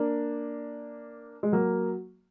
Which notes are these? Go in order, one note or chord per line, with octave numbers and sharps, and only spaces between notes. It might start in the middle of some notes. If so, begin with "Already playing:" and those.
Already playing: A#3 D4
G#3
F#3 A#3